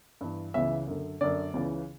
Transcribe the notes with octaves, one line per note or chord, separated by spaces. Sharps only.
G2 E3
C#2 C#3 E3 E5
F#2 D3
F#2 D3 D5
C#2 C#3 E3